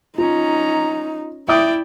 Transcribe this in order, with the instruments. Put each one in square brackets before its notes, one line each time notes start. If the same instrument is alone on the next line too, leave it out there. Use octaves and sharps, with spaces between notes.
[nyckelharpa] C#4 A#5 [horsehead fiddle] D#4 [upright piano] F4
[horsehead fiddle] E4 [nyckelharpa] D5 G5 [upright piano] E5 D#6